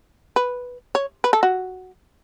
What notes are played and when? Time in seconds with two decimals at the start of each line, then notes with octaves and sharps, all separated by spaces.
0.36 B4
0.95 C#5
1.24 B4
1.33 A4
1.43 F#4